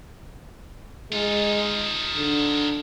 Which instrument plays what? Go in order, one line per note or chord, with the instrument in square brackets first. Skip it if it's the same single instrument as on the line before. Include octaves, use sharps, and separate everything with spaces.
[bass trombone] G#3 [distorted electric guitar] D#4 F4
[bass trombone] D3